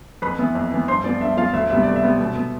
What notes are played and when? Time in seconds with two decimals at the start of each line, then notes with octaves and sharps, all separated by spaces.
0.22 F2 B4 B5
0.39 E3 B3
0.55 F2
0.71 E3 B3
0.88 G2 C5 C6
1.04 F3 B3 D5
1.21 G2 E5
1.37 F3 B3 F4 F5
1.53 D2 E5
1.70 C3 G3 B3 E5
1.83 D2 D5
1.96 E5
2.03 C3 G3 B3
2.20 B2
2.35 B3